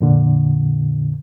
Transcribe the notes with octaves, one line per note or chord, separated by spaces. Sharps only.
F2 A#2 D3